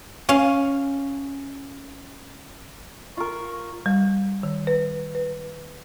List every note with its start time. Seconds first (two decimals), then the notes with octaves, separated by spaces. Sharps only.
0.29 C#4 F5
3.17 F4 A#4 C#6
3.86 G3
4.43 D#3
4.67 B4
5.15 B4